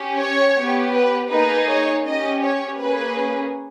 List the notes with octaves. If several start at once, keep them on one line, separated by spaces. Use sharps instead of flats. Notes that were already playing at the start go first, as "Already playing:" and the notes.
Already playing: C#4 G4
C#5
B3 G4
B4
A#3 D#4 G#4 B4
C#5
C#4 G4 D#5
C#5
A#3 C#4 G#4 B4